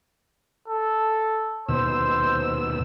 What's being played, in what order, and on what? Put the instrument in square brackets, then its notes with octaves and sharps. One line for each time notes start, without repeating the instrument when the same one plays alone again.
[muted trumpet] A4
[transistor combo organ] D#2 B2 E6 [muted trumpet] C5